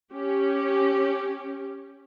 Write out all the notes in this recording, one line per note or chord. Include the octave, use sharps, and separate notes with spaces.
C#4 G4